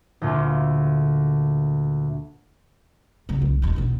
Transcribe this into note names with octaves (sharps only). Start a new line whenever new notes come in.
D2 A#2 F4
C#3 F#3
C2
E1 D#2
B1 B2